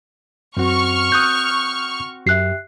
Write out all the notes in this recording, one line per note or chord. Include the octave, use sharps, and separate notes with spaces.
F#2 C4 F#4 C#6 F6
D#6 F#6 G6
F#2 G4 E5 F#6 C7